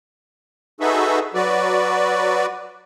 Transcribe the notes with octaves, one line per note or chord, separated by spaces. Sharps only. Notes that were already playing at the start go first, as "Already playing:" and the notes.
D#4 F#4 G#4 A4 B4 E5
F#3 F#4 B4 D5